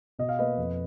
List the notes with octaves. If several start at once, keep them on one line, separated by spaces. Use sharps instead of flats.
B2 D#5
F5
A#3 B4 D#5
F2